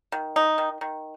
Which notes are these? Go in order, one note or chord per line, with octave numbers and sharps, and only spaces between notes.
D#3
D#4
D#3
D#3